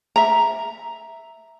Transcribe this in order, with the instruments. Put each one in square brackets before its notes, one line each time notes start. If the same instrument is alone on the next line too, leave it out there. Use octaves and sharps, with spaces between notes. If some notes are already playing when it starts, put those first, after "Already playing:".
[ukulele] E5 A#5